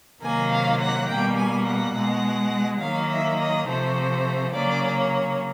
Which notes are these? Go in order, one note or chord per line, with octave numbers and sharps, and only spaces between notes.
C3 D#3 F#3 A#3 G#5
F5
F#5
B2 G3 A#3 G5
G#5
F#5
B2 G#3
D#3 F#3 A#3 F5
E5
D#5
C3 F3 A3 C5
C#3 F#3 A#3 D5
C#5